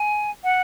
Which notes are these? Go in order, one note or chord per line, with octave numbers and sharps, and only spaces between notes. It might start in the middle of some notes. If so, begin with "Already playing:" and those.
Already playing: G#5
F#5